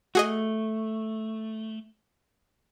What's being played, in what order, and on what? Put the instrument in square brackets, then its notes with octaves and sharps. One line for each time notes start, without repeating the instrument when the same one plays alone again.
[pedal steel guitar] A3 [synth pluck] F#4 G#4 D#5